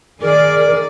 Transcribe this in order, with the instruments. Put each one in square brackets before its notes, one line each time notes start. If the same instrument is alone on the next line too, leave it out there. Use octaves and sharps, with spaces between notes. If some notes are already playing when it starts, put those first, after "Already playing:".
[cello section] D#3 G#4 D5 [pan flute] A#4